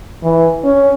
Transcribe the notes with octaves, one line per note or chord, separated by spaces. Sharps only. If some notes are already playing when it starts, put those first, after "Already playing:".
E3
C#4